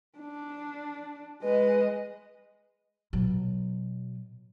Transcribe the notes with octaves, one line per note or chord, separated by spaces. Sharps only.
D4
G#3 B4 D#5
B2 F#3